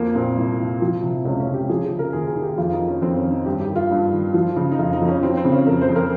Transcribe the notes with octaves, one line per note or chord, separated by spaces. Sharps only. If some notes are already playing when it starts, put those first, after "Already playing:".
Already playing: F2 F3 A#3
A#2 C4
C2
C2
F3
C3
C#2 C#4
C#4
C#2
G4
F3 G#4
G#4
C#3
A#4
D#2 G#4
G#4
D#2
G4
F2 F4
D#4
D#3
C#4
F2 C4
C#4
D#3
D#4
G2 G4
G4
D#3
F4
G2
D#3
F3
C#3
D#4
F2 F4
D#4
F2
C#4
F3 C4
C4
C#3
C#4
F2 A#4
C5
F2
A#4